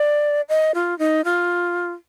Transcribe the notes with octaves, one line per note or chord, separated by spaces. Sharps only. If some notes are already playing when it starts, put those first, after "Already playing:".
Already playing: D5
D#5
F4
D#4
F4